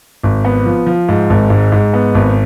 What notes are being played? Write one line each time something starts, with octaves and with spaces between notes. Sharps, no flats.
G#1
B3
F3
F3
G#2
G#1
G#2
G#2
B3
G#1